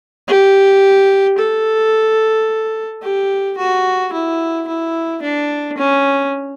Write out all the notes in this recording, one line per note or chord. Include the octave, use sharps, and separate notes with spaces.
G4
A4
G4
F#4
E4
E4
D4
C#4